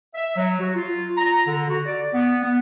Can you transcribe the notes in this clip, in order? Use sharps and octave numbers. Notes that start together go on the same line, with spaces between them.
E5
F#3
F#4
F4
A#5
D3
F#4
D5
B3
B3